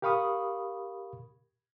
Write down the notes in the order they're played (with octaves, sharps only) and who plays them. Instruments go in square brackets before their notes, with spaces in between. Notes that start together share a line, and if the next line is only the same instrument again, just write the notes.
[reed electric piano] G4 A#4 F5 B5 C#6 D#6